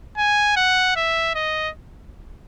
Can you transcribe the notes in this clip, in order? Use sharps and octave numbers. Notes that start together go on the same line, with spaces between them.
G#5
F#5
E5
D#5